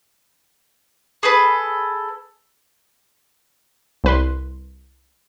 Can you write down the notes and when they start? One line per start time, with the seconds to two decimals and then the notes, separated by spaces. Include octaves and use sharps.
1.23 G#4 A4 B4
4.04 C2 B4 C6